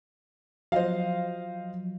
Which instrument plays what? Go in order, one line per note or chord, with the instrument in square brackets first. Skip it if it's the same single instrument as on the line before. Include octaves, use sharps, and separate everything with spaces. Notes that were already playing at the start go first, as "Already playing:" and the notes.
[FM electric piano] F3 F#3 [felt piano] C5 D#5 F5